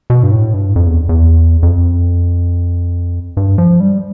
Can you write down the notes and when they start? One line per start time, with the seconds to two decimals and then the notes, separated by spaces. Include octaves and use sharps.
0.10 B2
0.23 G2
0.32 A2
0.54 G2
0.76 F2
0.86 E2
1.09 E2
1.63 F2
3.37 G2
3.58 F3
3.80 G3